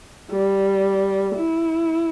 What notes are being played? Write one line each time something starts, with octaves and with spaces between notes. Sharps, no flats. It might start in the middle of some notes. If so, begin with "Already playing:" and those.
G3
E4